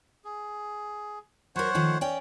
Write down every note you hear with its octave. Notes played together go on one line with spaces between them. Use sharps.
G#4
F#3 A#4 C5 C#5 F#5
D#3 F3 A3
C#4 C#5 D5 G5